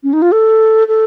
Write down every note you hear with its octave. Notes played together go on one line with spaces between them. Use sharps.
C#4
D#4
F4
A4
A4